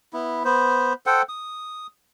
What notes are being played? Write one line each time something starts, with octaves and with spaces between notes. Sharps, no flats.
B3 E4
B3 C5
A4 C5 F#5 G5
D#6